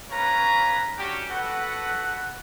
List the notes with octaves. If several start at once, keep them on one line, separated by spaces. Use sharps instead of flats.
A#3 C#4 B4 C#5 A#5
C#4 D4 F#4 G4
F#4 A4 B4 F#5